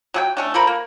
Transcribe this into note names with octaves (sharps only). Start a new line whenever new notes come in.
F#3 G#4 G5
A3 C#4 D4
F3 A4 A#4 B5
A#3